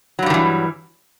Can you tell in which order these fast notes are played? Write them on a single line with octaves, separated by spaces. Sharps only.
F#3 G2 G3 D#3 E3